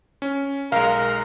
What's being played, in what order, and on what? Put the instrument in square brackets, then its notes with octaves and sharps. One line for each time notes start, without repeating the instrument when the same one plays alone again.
[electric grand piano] C#4
[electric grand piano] B1 G#3 [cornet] A#4 [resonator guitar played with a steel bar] F5